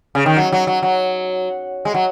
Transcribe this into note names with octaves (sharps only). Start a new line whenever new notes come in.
C#3
D#3
F#3
F#3
F#3
F#3
G#3
F#3